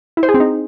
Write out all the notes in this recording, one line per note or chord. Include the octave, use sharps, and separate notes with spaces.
E4
C5
G#4
C4
D#4